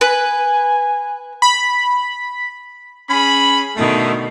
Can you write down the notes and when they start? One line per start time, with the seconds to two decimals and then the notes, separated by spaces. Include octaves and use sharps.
0.01 B4 G#5
1.42 B5
3.10 C#4 G#4 B5
3.76 B2 D3 D#3 A3